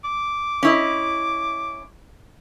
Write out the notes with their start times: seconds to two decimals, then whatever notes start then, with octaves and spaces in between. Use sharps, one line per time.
0.04 D6
0.63 C#4 E4 D#5